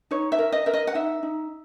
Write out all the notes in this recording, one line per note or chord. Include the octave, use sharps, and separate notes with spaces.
D#4 C#5
E5
A#4
D#5
A#4 E5
D#5
F#5
D#4 E5
D#4